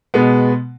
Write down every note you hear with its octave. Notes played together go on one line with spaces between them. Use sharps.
B2 G#3 B3